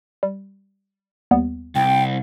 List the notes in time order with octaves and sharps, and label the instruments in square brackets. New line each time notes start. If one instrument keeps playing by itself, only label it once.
[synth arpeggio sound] G3
D#2 G3 B3
[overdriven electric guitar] C2 [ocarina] G5